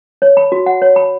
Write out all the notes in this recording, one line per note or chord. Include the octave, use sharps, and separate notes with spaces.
C#5
B5
F#4
F#5
C#5
B5